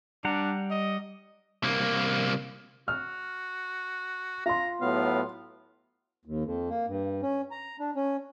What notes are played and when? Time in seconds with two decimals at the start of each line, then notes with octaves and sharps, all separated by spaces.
0.25 G3 D4 F#5 A#5
0.71 D#5
1.64 C2 A#3
2.88 F#4 F6
4.46 F4 A#5 C6
4.81 A2 F#3 B3 F5
6.25 D#2
6.44 F2
6.70 A#3
6.87 G2
7.22 C#4
7.51 A#5
7.80 D4
7.96 C#4